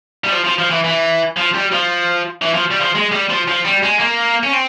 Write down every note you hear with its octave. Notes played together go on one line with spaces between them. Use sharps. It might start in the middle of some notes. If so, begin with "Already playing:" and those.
G3
F3
F3
F3
E3
E3
F3
G3
F3
E3
F3
G3
F3
G#3
G3
F3
F3
G3
G#3
A#3
C#4
C4